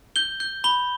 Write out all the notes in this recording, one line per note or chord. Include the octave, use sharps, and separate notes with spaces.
G6 G7
G6
B5 G7